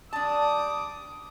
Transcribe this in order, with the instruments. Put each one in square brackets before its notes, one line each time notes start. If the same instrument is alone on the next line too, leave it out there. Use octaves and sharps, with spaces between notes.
[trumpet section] G3 D6 D#6 [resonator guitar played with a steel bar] D4 A5